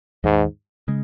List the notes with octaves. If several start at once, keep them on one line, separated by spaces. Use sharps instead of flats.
D#2 G#2 D#3 G#3
C#3 G#3